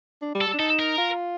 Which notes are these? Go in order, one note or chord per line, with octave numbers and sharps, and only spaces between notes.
D4
G3
A4
G3
D4
D#4 A4
A#4
F4